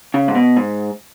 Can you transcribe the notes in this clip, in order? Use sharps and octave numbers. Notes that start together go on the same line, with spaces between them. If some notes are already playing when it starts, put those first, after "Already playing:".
C#3
G#2
B2
G#2